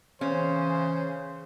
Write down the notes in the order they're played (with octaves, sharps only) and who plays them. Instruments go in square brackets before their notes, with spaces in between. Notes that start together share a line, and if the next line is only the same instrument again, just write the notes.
[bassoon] C#3 [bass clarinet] E3 [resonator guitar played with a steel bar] C#4 [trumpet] C5